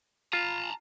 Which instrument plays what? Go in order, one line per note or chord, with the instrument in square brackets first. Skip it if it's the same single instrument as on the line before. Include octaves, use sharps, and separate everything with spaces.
[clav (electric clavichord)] F4 [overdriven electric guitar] A5 A#5